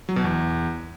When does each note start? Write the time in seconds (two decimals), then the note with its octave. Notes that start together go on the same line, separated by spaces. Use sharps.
0.09 F#3
0.16 B2
0.24 E2